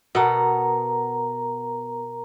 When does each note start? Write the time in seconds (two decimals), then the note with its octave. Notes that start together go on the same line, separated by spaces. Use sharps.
0.15 B2 B3 A4 A#4 A#5